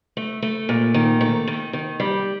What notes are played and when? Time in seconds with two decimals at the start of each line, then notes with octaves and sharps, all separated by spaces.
0.17 A3
0.42 A3
0.69 A#2
0.94 D#3
1.21 A3
1.47 D#3
1.73 D#3
2.00 G3